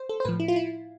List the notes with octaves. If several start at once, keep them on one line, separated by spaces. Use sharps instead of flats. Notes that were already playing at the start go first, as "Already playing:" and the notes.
Already playing: C5
A4
C5
A2 F3 B4
E4
F4
E4